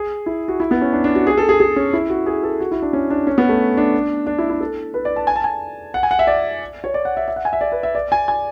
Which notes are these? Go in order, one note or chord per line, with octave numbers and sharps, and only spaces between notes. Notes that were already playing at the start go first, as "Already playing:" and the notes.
Already playing: G#4
E4
F#4
E4
B3
C#4
D4
D4
F#4
G#4
A4
G#4
G#4
C#4
E4
F#4
G#4
A4
F#4
E4
D4
C#4
D4
C#4
B3
A3
D4
D4
E4
E4
A4
B4
D5
A5
G#5
A5
G#5
F#5
G#5
F#5
E5
D5
C#5
D5
F#5
E5
E5
F#5
G#5
E5
D5
B4
E5
D5
G#5
G#5